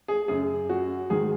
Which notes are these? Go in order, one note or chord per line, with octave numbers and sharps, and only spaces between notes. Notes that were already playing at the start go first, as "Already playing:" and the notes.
G#4
F#2 C#3 G#4
F#4
G#2 D#3 G#4